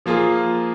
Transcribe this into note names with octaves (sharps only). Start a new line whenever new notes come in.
F3 A#3 F4 G#4